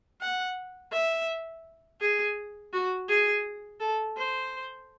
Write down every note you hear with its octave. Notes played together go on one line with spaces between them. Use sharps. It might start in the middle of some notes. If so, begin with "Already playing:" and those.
F#5
E5
G#4
F#4
G#4
A4
C5